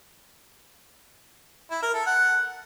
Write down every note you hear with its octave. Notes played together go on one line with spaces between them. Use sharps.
E4
A#4
A4
F#5